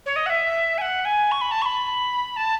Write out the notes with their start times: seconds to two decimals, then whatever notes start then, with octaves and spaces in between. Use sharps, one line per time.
0.06 C#5
0.16 D#5
0.26 F#5
0.30 E5
0.78 G#5
0.81 F#5
1.05 G#5
1.31 C#6
1.41 B5
1.51 A5
1.62 C#6
1.65 B5
2.36 A5